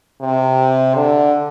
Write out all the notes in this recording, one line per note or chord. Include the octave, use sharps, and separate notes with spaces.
C3
D3